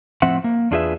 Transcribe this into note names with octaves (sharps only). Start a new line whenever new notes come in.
A2 F3 C4 E5 F#5
A#3
E2 D4 F4 G#4 B4 E5